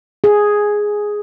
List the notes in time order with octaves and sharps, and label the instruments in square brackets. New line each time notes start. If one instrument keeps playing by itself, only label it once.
[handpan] G#4